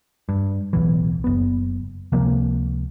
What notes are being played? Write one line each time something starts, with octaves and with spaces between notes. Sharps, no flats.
G2
D1 B1 E3
F#1 B3
C#2 C3 F3 A#3